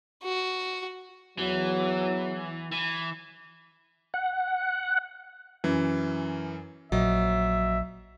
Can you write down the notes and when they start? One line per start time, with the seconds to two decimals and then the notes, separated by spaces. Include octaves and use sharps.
0.23 F#4
1.39 E2 E3 F#3
2.72 E3
4.14 F#5
5.64 F#2 E3
6.92 A#1 F#3 D#5 E5